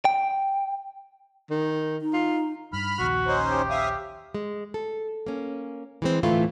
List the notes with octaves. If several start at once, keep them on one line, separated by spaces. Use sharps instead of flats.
G5
D#3
D#4
F4
G2 B5 F6
A#1 D#2 F#4
C#4 D#4 C5
G4
E5 F5 D#6
G#3
A4
A#3 C#4
E3 G#3 C4
D2 A2 E3 A3 E4 F4